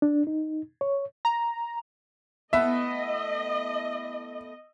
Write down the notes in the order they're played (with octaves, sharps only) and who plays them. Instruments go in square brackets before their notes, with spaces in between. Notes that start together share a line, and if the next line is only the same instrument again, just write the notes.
[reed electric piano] D4
D#4
C#5
[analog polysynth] A#5
[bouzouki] A3 B3 E4 [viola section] D#5 [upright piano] E5